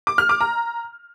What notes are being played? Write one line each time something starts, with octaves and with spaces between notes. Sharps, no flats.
D6
F6
D6
A#5